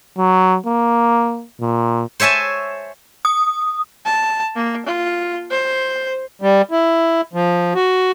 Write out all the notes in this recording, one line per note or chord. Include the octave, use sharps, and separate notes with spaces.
F#3
A#3
A#2
C5 C#5 E5 G#5 A5
D#6
A5
A#3
F4
C5
G3
E4
F3
F#4